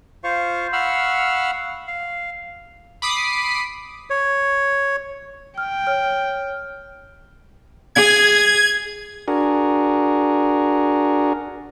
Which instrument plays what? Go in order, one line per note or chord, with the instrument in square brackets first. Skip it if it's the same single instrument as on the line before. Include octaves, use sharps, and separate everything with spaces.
[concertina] F4 C5 F5 C#6
F5 F#5 B5 C#6 E6 F6
F5
[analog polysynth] B5 D6 D#6 C7
[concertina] C#5
[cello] G5 [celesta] F6
[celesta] C#5 F6
[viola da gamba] G#4 [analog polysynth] G#6
[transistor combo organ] D4 F#4 G#4 A#4